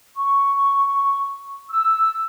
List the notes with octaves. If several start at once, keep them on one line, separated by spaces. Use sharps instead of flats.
C#6
E6